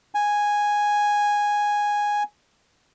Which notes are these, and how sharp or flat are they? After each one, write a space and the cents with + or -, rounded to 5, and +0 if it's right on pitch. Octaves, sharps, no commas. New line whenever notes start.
G#5 -5